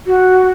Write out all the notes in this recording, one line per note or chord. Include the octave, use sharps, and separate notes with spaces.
F#4